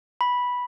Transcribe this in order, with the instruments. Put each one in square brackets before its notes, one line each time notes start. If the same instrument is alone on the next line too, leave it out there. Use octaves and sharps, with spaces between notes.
[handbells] B5